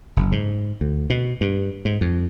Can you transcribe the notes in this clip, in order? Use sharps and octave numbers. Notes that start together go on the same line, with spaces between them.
F#1
G#2
D2
B2
G2
G#2
F2